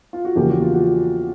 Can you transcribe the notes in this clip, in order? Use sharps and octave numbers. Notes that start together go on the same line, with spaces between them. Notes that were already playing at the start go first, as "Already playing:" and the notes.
F4
F#4
E2 C#3 F3 A#3 G4
F#4
F4
F#4